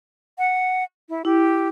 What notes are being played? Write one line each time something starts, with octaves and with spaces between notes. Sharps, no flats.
F#5
E4
E4 G4